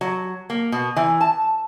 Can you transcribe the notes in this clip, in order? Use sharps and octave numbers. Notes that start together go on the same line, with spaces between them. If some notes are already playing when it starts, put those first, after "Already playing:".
F#3
A#3
B2
E3
A5